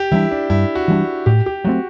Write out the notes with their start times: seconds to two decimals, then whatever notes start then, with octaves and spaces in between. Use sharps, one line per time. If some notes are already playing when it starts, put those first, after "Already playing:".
Already playing: G4
0.12 E3 G3 D4 E4
0.31 D4
0.50 G2 E4
0.75 F#4
0.88 E3 G3 D4
1.26 A2 G4
1.46 G4
1.64 F#3 A3 C4 F#4